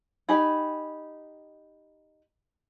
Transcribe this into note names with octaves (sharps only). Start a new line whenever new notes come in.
D#4 G4 G#5 B5